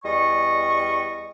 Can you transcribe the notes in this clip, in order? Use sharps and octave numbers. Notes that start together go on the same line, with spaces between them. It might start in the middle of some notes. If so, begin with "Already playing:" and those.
E2 G3 D5 D#5 C#6